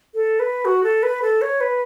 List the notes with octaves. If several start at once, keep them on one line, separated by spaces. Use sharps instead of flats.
A4
B4
F#4
A4
B4
A4
C#5
B4